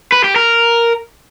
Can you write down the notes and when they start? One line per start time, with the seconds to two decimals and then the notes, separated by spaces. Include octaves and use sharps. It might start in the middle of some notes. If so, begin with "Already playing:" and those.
0.12 B4
0.24 G4
0.36 A#4